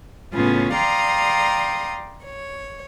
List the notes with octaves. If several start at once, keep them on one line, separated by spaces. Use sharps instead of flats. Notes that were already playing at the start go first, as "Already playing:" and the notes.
A2 C#3 B3 C#4 F4
D5 F5 G5 A#5 C6 D#6
C#5